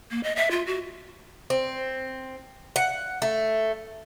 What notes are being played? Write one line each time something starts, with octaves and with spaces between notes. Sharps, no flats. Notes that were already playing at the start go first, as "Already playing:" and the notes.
A#3
D#5
E5
F4
F#4
C4
F#5
A3